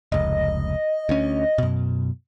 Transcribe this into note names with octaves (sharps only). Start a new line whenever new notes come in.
F1 C#2 D#5
D2 C#4
F#2 B2